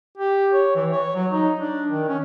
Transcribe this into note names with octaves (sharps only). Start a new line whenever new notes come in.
G4
C#5
E3
C#5
F#3
D#4
D4
D#3
C#4